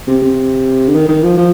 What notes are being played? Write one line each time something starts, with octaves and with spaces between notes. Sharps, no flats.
C3
C3
D3
D#3
D#3
F3
F3